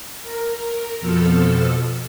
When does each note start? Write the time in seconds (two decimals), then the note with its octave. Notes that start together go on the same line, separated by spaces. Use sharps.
0.23 A#4
1.01 F2 B2 F3 A4 E6 F6